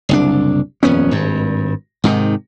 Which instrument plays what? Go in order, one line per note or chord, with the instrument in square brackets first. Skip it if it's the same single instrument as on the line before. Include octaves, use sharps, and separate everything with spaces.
[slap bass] F#1 C2 D4
D#1 F2 B3 C#4
G#1 G2
G#2 C3 D#3